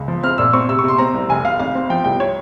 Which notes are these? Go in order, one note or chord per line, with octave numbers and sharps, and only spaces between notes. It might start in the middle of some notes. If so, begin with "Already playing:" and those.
Already playing: C#2
F3
C4 F6
A#2 E6
C4 C#6
C3 E6
C#6
C3 C6
C4 A#5
C2
F1 G#5
F1 F5
G#1 F5
C4
F3 G5
C2 G5
C#5